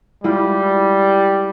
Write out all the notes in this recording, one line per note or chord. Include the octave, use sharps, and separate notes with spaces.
G3 G#3 E4 F4